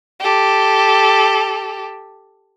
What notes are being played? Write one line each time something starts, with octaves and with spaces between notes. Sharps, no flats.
G4 A4